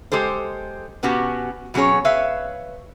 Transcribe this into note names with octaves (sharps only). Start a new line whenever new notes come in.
G#3 G4 A4 C5
B2 B3 C#4 F#4 G4 A5
B2 F#3 C#4 G#4 C#5
B4 C#5 E5 F5